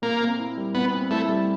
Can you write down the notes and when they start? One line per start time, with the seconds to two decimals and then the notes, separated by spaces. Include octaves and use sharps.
0.02 A#2 A#3
0.20 C4
0.39 E4
0.57 G3
0.75 A#2 B3
0.93 C4
1.11 A3 E4
1.29 G3